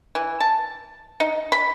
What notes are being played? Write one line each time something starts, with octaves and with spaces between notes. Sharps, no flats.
E3
A5
D#4
B5